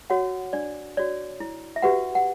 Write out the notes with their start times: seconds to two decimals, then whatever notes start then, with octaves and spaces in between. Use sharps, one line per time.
0.10 F#4 C#5 F#5
0.53 D4 D5
0.97 F#4 C#5 D5
1.40 E4
1.76 E5
1.82 F#4 G4 B4 F#5
2.15 F#5